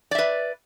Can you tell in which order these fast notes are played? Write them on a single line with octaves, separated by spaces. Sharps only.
D5 E5 B4